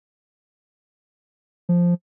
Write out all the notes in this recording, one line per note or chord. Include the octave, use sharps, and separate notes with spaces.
F3